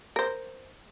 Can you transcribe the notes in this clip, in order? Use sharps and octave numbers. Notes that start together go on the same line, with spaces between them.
A#4 C5